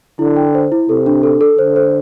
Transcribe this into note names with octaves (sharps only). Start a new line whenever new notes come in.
D3 E4
G5
C5
E4
C3 A4
D4
A4
A4
D3 C5
C5